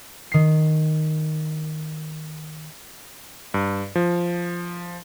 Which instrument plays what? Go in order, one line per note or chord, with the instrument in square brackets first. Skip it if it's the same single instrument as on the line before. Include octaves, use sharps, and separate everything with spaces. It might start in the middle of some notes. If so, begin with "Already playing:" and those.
[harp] D#3 C7
[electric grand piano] G2
F3